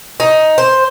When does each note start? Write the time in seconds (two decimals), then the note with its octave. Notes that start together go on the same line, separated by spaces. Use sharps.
0.20 D#4
0.58 C5